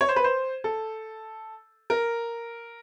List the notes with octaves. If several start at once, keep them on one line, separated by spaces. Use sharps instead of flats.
C#5
C5
B4
C5
A4
A#4